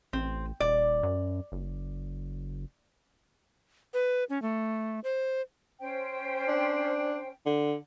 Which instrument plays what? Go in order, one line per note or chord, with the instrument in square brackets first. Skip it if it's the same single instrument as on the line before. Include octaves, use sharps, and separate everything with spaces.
[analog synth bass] A1 [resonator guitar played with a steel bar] C4
[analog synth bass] D#1 [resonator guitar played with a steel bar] D5
[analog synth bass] F#2
F#1
[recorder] B4
C#4
A3
C5
[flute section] C#4 C5 G5
[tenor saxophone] D4
D3